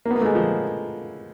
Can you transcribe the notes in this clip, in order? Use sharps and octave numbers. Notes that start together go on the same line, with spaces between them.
A#3
B3
A#3
A3
G#3
F3